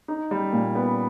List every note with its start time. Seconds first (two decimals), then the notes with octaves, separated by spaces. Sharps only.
0.08 D#4
0.31 G3
0.53 A#2
0.75 B3